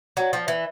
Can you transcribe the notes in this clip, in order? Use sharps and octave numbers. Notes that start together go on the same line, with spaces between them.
F#3
F3
E3